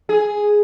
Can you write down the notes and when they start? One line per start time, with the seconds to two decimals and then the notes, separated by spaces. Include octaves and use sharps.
0.09 G#4